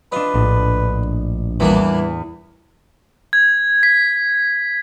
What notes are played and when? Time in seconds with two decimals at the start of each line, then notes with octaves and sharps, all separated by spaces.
0.12 D4 F4 B4 D#5
0.34 A#1 A2
1.60 E2 E3 G3 A#3 D4
3.33 G#6
3.83 B6